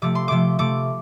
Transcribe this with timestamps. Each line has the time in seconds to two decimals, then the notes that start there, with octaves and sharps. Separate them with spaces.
0.02 C3 F3 A3 D6
0.15 C6
0.28 C3 F3 A3 D6
0.59 C3 A3 D6